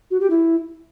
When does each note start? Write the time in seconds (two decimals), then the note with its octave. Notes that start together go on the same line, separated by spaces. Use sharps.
0.11 F#4
0.20 G4
0.30 E4